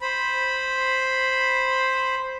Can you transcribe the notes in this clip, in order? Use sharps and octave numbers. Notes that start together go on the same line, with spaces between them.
C5 B5